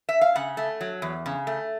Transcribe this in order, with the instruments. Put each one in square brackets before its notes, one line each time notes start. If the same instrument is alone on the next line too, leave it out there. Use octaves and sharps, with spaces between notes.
[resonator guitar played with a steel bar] E5
F5
C#3 F#5
A3
F#3
E2
C#3
A3